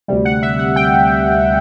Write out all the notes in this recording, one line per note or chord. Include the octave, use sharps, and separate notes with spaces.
D2 C3 G3
F#5
E5
F#5
G5